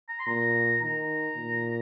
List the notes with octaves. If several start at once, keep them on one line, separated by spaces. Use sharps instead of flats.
A#5
C6
A#2 A#5
D#3 A#5
A#2